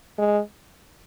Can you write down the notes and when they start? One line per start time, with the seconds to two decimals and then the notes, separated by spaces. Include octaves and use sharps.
0.18 G#3